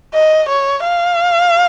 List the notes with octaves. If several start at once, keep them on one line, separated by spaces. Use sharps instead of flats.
D#5
C#5
F5